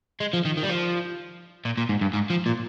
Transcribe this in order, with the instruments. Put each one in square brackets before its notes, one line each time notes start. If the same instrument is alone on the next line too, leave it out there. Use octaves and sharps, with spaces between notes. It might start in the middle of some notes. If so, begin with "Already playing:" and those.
[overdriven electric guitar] G#3
F3
D#3
D#3
G3
F3
A#2
A#2
G#2
G2
G#2
F3
A#2